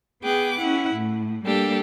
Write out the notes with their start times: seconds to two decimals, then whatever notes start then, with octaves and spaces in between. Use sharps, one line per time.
0.22 B3 G#4 G5 D6 F#6
0.59 C#4 E4 F#5
0.94 A2
1.44 G3 A#3 D4 G4 A4